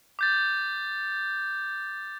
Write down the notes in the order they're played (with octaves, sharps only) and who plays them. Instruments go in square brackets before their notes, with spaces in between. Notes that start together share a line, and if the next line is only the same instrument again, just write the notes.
[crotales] D6 G6 A6